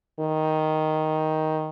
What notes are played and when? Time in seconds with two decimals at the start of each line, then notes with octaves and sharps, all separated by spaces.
0.20 D#3